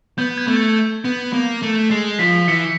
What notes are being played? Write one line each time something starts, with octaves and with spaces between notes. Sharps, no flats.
B3 G6
G#6
A3
G#6
B3
A#3
A3
G#3 C7
F3 B6
E3 B6 C#7